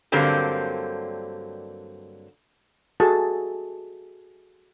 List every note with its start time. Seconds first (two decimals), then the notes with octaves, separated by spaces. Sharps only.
0.12 G2 D3 F#3 A#3 C4 G4
3.00 F#4 G#4 A4 A5